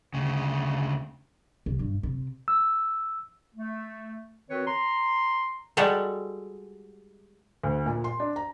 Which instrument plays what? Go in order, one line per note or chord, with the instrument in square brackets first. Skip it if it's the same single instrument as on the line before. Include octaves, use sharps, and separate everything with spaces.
[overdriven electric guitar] D2 C#3
[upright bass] C2
G2
C3
[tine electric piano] E6
[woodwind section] A3
D#3 C4 F#4 B4 C#5
A#5 C6
[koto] G3 G#3 F#4 G4 A4
[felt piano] D2
A#2
C6
D4
A#5